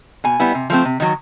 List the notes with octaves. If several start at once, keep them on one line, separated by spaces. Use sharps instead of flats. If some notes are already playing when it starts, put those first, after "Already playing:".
B2 G#5
G3 B3 E4
C3
F3 A3 C4
C3
D#3 F#3